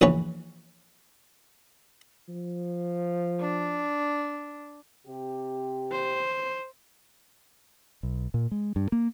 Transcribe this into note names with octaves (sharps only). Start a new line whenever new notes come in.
A#1 E3 B4 C#5
F3
D4
C3 G4
C5
B1
A#2
G#3
G2
A#3